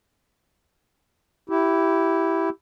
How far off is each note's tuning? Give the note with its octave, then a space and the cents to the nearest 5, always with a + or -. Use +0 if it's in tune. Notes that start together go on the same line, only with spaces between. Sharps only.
E4 +0 G4 -15